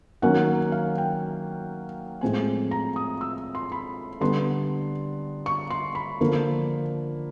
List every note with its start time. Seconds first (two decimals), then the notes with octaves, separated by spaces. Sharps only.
0.22 D#3 F#3 A#3 C#4 F#5
0.72 F5
0.98 G5
2.21 A2 F3 G#3 C4 G#5
2.71 A#5
2.96 D#6
3.21 E6
3.55 C6
3.72 B5
4.21 D3 G3 B3 D4 C6
5.46 C#6
5.70 C6
5.95 B5
6.21 D3 F3 A#3 D4